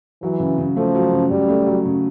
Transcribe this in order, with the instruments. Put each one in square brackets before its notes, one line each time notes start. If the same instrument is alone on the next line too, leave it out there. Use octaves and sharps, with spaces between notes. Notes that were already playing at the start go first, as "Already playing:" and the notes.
[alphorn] E3 [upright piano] F#3
[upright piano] C#3
C#3
[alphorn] F3 [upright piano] A3
[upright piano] F#3
C#3
[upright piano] C#3 [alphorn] G3
[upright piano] A3
F#3
C#3